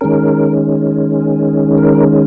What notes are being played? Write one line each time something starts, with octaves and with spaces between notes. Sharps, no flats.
D#3 G#3 C#4 A#4
A#4